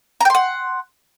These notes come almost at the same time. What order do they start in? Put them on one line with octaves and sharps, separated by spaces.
A#5 G5 C6 F#5